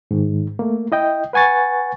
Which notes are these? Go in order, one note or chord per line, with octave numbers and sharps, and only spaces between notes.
G#2 D#3
A3 A#3
E4 D#5 G5
B4 F#5 G#5 C#6 A6